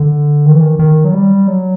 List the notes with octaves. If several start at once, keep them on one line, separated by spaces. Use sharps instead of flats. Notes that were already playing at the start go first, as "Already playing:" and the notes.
Already playing: D3
D#3
E3
D#3
D#3
F#3
G3
F#3